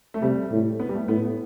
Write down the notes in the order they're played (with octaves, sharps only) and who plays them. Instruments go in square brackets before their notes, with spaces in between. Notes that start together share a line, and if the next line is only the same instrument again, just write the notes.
[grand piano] A3
[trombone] C3 [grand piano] G3
[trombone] A2
[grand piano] B3
G3
A3
[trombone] A2 [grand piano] B3